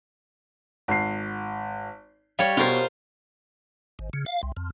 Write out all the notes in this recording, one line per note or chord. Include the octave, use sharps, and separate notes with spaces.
G#1 C7
G3 C#5 F5
B2 F4 A#4 C5
G#1
C#3
F5
C2
F2